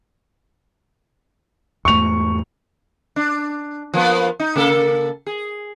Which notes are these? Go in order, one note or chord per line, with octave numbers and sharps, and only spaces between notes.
E2 G#2 A3 C#6 F7
D4
F3 A#3 B3
D#4
C#3 A#3 A4
G#4